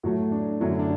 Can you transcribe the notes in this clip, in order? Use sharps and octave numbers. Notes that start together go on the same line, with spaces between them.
A2 F#3 A3 F#4
D4
F#2 D3 F#3 A3 E4
D4